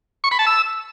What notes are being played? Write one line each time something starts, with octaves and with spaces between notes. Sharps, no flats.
C#6
B5
A5
E6